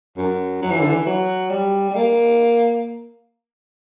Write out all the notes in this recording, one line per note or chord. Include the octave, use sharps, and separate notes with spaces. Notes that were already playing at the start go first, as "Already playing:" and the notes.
F#2
F#3
E3
D3
E3
F#3
G3
G3
A#3